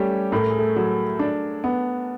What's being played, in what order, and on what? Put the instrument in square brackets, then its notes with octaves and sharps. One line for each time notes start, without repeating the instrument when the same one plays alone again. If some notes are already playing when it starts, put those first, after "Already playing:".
Already playing: [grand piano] G3 C#4 G4 C#5 [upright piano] A3
[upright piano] A2 [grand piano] A#4
[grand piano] A4
G#4
A3 A4
[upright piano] F#3
D4
B3